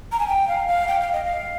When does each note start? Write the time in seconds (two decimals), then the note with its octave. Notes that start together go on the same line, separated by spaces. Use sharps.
0.12 A#5
0.20 G#5
0.28 G5
0.48 F5
0.67 F5
0.87 G5
1.00 F5
1.12 D#5
1.25 F5